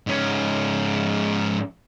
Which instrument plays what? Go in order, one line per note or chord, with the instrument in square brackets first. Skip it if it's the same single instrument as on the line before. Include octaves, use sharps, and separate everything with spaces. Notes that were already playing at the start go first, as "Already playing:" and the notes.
[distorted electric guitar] G#2 C#4